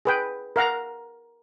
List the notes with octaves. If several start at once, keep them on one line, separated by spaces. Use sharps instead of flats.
G#4 B4 G5
A#4 F5 F#5 A#5